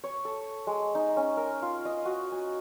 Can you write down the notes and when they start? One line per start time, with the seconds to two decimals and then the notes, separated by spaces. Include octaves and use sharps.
0.04 C#5
0.25 A4
0.67 G#3
0.95 D#4
1.17 C#4
1.37 A#4
1.62 F4
1.85 D#5
2.05 F#4
2.32 G#5